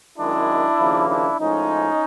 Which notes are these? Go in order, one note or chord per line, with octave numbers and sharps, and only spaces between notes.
F#2 D#3 G#3 D4 E4
D#2 C#3 F3 A#3
D4 E4
A2 F3 G#3 C#4 D#4